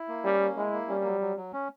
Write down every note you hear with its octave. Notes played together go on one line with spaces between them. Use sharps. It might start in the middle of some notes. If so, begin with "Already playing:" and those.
Already playing: E4
A#3
G3 C#4
A#3
G#3 E4
A#3
G3 C#4
F#3
F#3
F#3
C#4